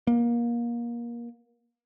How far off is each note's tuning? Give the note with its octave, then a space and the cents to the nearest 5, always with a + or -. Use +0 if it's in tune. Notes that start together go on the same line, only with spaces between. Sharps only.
A#3 +25